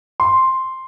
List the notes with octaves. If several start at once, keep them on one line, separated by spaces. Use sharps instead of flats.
C6